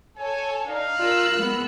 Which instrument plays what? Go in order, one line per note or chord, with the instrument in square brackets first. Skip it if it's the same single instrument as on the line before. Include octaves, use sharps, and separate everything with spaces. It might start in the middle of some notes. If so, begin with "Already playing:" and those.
[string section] A4 C#5 [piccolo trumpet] G#5
[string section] D4 D#4 [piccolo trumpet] F5
[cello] F4 A#4 [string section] E6 F#6
[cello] G#3 B3